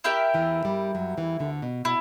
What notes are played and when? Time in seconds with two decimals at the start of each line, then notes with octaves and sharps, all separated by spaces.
0.04 E4 G4 A#4 E5
0.34 E2 E3
0.65 G2 G3
0.95 F#2 F#3
1.17 E2 E3
1.39 D2 D3
1.62 B2
1.85 B2 E4